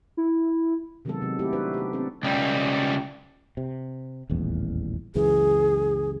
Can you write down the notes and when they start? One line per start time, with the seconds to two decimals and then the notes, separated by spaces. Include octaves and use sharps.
0.17 E4
1.05 C3 D#3 F#3 G#3 B3 A4
1.21 C3 F#3
1.39 A3 E4 G4
1.53 D4 D#4 F#4 B4 C5
1.74 B3 G4
1.93 B3 C4 D4 A4
2.23 C#2 G3
3.57 C3
4.30 D#1 A1 E2
5.15 C#2 F#2 E3 G#4